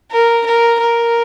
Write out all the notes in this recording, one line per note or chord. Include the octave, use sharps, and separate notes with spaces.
A#4
A#4
A#4